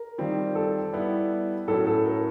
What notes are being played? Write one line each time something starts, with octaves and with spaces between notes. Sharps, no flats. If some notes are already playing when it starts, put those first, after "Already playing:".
Already playing: A#4
D#3 G3 C4 F4
A4
G3 B3 E4 G4
A2 F#3 A3 C#4 A4
A4
A#4